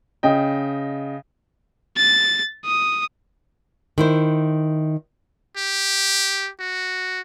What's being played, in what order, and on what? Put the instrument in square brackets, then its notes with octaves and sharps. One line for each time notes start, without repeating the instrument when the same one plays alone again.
[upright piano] C#3 D#5 G5
[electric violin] A6
D#6
[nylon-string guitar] D#3 E4 C5
[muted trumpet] G4
F#4